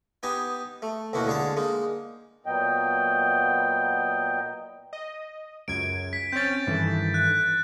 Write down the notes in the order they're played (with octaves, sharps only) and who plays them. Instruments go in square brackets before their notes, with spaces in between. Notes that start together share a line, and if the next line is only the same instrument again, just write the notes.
[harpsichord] B3 D#4 G4 D#5 G#5
A3
A1 D#2 B2 A#3 E4 F#4
D3 G#3 G#4 F5 A5
G#3 A#3 D#4
[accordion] A#2 F#3 B3 D#5 G5
[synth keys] D#5
[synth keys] C#2 F#2 G#6 [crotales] D7
[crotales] B6
[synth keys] C4 C#4 [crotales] G6 A6
[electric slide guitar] G2 D#3 A4 [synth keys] E3
[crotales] F#6